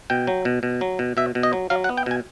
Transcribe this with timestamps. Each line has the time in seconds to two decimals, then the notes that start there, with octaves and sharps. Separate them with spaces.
0.10 B2 G5
0.27 F#3
0.45 B2
0.63 B2
0.81 F#3
0.99 B2
1.17 B2 E5
1.35 B2
1.43 D#5
1.53 F#3
1.70 F#3 F5
1.84 F#5
1.89 B3
1.97 G5
2.06 B2 G#5